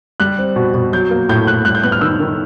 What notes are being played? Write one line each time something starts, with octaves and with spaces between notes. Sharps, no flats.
G3 F#6
C4
B2
B2
F#3 G6
A#3
A2 G6
A2 F#6
G3 F#6
G6
B3 F#6
F6
D#3 E6
D#3